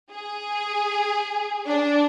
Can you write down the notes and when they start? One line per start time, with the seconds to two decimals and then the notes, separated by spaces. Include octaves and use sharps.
0.11 G#4
1.66 D4